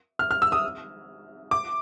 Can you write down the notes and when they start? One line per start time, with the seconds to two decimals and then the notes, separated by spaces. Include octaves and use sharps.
0.19 F6
0.31 F6
0.42 E6
0.52 D#6
1.51 D6